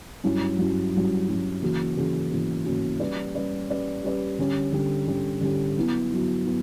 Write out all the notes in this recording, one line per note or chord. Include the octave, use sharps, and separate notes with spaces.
G2 F#3 C#4 E4
G2 F#3 C#4 E4
G2 F#3 C#4 E4
G2 F#3 C#4 E4
C#3 E3 A#3 C#4 F#4
C#3 E3 A#3 C#4 F#4
C#3 E3 A#3 C#4 F#4
C#3 E3 A#3 C#4 F#4
G3 C#4 G4 B4 D5
G3 C#4 G4 B4 D5
G3 C#4 G4 B4 D5
G3 C#4 G4 B4 D5
D3 G3 C#4 G4
D3 G3 C#4 G4
D3 G3 C#4 G4
D3 G3 C#4 G4
F#3 B3 E4
F#3 B3 E4
B3 E4